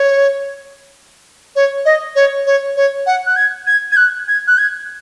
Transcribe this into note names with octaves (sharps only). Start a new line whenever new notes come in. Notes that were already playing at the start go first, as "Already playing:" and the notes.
Already playing: C#5
C#5
D#5
C#5
C#5
C#5
F#5
F#6
G#6
G#6
G#6
F#6
G#6
F#6
G#6